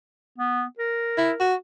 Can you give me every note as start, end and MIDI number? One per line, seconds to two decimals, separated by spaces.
0.38 0.64 59
0.79 1.48 70
1.18 1.32 64
1.40 1.54 66